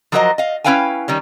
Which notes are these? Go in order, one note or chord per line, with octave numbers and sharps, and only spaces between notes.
F3 F#3 F#4 A#4 C5 D#5
D#5 F5
C#4 E4 B4 F5 G5 G#5
D#3 G3 C#4